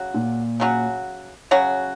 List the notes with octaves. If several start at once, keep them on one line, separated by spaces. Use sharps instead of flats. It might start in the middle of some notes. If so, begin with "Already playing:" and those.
Already playing: C#3 F#3 F#4
A#2
C#3 F#3 C#4 F#4
C#3 F#3 C#4 F#4